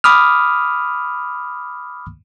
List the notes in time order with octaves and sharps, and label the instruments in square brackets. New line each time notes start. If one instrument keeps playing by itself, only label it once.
[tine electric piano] B5 D6 D#6 F6